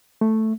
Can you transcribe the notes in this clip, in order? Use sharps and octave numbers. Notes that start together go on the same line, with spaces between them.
A3